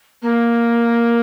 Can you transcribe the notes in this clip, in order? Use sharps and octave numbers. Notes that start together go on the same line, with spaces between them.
A#3